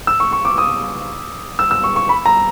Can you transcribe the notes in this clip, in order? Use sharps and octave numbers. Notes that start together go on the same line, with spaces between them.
E6
C#6
C#6
D6
D#6
E6
E6
C#6
C#6
B5
A#5